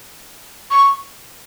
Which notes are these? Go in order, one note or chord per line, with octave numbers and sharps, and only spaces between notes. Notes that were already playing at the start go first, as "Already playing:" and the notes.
C#6